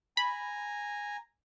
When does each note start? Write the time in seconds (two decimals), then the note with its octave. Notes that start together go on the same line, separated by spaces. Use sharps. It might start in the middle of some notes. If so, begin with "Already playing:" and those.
0.17 G#5 A#5 B5